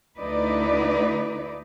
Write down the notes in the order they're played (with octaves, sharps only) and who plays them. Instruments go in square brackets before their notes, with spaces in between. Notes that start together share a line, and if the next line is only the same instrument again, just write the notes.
[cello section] D2 D3 D#4 E4 B4 D5